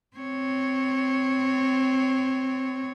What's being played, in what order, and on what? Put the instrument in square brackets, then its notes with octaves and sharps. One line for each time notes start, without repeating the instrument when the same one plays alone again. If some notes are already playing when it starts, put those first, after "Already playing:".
[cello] C4 C#5